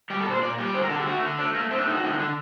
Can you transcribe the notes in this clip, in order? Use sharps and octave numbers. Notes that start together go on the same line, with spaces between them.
G3 G4
A4
A#2 C5
A#2 D5
G3 G4
D3 C5
A#4
D3 A4
G4
A3 F#4
D3
A3 D4
A3 A#3
A3 C4
D4
A2 D#4
F#4
D3 D#4
D#4
D3 D4